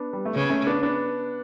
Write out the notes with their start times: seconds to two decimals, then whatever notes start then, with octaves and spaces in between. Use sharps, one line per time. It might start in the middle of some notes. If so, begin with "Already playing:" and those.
Already playing: B3 D4
0.13 G3
0.25 A3
0.35 C#3 B3
0.50 A3 C#4
0.67 B3 D4
0.83 B3 D4